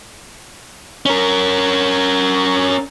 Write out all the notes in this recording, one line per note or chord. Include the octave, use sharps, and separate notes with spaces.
C#4 A#4